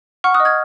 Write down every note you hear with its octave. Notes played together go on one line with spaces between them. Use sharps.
F#5 C#6 F6
D#6 F#6
D#5
F6 G#6